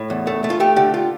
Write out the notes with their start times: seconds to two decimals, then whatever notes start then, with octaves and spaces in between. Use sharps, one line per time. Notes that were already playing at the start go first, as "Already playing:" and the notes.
Already playing: A2
0.10 E2
0.27 A3
0.44 A3
0.50 F4
0.60 A3 G4
0.76 D3 G4
0.94 F4